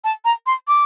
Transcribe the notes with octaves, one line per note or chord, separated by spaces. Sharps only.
A5
A#5
C6
D6